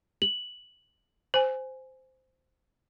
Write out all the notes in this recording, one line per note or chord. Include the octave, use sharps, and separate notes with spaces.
F#7
C5 G#5